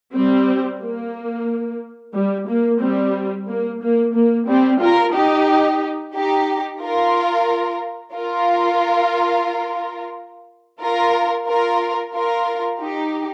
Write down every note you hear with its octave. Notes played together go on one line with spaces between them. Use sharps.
G3 C4
A#3
G3
A#3
G3 C4
A#3
A#3
A#3
G3 C4
F4 A#4
D#4 G4
D#4 G4
F4 A#4
F4 A#4
F4 A#4
F4 A#4
F4 A#4
D#4 G4